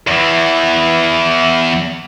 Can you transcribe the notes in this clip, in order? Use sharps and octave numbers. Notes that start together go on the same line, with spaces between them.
E2 E3